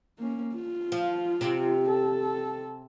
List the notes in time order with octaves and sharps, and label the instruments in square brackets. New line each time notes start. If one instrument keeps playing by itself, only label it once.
[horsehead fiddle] A#3 C#4
F4
[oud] F3
C3
[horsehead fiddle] A4